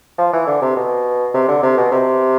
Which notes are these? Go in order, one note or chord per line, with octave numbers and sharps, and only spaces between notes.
F3
E3
D3
C3
B2
C3
D3
C3
B2
C3